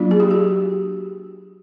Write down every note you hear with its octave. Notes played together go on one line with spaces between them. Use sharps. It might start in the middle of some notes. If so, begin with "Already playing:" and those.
Already playing: F#3 A#3 D4 F4
G#4
G4
F#4